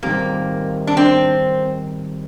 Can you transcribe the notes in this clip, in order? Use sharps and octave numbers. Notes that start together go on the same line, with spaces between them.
D#3 G3 A#3 C4 G4 A#4
D4
C4